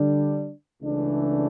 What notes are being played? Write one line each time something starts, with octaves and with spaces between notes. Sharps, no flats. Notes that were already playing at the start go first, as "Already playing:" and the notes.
Already playing: D3 G3 D4
C#2 C#3 E3 A3 D4